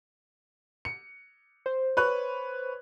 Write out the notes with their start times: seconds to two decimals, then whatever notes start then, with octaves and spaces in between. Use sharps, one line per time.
0.85 C#7
1.66 C5
1.97 B4 C#5 F#6